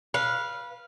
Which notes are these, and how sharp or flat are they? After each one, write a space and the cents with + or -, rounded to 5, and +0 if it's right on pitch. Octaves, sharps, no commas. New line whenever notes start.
B4 -20 F5 -5